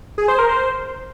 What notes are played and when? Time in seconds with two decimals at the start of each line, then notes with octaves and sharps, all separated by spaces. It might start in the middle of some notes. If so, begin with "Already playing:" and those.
0.18 G#4
0.28 C5
0.38 A#4
0.49 C5